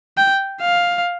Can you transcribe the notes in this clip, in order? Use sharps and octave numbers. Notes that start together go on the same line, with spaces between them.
G5
F5